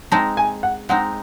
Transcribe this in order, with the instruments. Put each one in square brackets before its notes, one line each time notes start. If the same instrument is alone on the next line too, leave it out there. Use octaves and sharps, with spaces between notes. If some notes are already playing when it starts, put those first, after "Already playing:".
[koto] G#3 C4 D#4 [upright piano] A5
[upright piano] G#5
F#5
[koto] G#3 C4 D#4 [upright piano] F#5